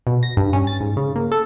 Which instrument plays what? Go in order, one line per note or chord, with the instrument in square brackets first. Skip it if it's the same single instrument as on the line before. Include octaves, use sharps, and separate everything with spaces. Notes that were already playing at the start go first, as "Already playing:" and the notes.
[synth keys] B2
A#6
G2
C#4
A6
G#2
C#3
A#3
A4